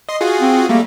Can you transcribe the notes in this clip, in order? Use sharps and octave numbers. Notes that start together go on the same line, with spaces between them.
D#5 C6
F4 F#4 G#4
C4
G3 A3 A#3